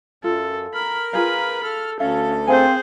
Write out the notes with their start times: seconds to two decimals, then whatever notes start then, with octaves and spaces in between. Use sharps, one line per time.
0.24 F#2 F4 A4
0.74 A#4 B5
1.13 F4 G#4 B4 F5 B5
1.64 A4 F6
2.00 D2 C#4 A4 F5
2.48 C4 G#4 A#4 C5 F5 G#5